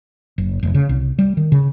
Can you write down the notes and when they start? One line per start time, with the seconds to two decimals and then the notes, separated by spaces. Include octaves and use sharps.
0.38 F#1
0.63 F1
0.74 C#3
0.89 C2
1.19 G3
1.37 D#3
1.52 C#3